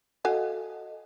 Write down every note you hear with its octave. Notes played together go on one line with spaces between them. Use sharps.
F#4 A4 D#5 F5 G#5